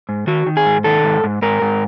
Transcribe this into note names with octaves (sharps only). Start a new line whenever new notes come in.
G#2
D#3 F#4
D#3
G#4
G#2
D#3 A4
G#2
G#2
G#2 A#4
G#2